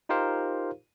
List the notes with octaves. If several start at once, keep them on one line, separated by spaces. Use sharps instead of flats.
D#4 F4 G4 A#4 C5 F5